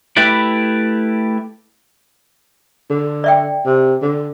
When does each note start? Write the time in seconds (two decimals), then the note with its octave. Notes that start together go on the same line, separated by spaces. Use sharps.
0.17 A3 E4 G4 B4 D5
2.90 D3
3.24 D5 E5 G5
3.65 C3
4.02 D3